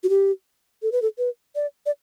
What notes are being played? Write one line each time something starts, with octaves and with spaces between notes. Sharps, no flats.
F#4
G4
A4
B4
A4
B4
D5
D5